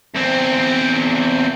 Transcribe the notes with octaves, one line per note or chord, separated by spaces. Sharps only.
E2 C4